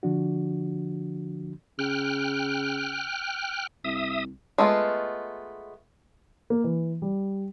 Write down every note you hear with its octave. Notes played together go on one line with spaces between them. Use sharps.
D3 F3 D4 F#4
C#3 G5 F6 F#6
C2 E5 D#6
G#3 A3 B3 F4
A#3
E3
G3